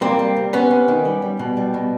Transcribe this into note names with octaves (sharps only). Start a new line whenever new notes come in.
G3 A#3 C4
G3
C3
C3 B3 C#4
C3
D#3
G3
G3
B2
G3
B2